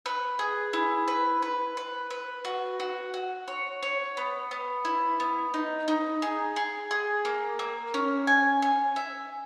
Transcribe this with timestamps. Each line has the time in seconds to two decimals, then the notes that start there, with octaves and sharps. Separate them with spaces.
0.06 B4
0.39 G#4
0.73 E4
1.08 B4
1.42 B4
1.77 B4
2.10 B4
2.45 F#4
2.80 F#4
3.14 F#4
3.48 C#5
3.83 C#5
4.17 B3
4.51 B3
4.85 E4
5.20 B3
5.54 D#4
5.88 D#4
6.22 G#4
6.56 G#4
6.91 G#4
7.25 A#3
7.59 A#3
7.94 C#4
8.27 G#5
8.62 G#5
8.96 E5